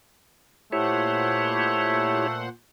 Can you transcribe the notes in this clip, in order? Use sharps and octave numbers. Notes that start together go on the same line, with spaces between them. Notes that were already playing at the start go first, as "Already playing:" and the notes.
A#2 A3 E4 G4 C5 C#5 F#5